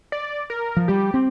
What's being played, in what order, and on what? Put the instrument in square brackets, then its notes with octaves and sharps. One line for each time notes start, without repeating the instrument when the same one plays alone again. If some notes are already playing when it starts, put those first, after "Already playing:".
[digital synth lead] D5
A#4
[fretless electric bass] F3
[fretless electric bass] G3 [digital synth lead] G4
[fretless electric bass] C4